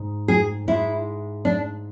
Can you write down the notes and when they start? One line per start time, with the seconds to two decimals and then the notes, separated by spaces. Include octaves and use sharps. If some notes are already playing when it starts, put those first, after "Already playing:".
Already playing: G#2
0.28 G#4
0.68 G#2 G#3 E4
1.45 D4